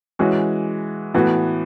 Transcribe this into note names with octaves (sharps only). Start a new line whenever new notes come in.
E3 G#3 C#4 F#4
A2 E3 B3 F#4